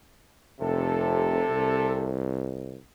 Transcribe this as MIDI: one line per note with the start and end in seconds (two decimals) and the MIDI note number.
0.60 1.42 29
0.60 2.18 48
0.60 2.18 69
1.50 2.76 36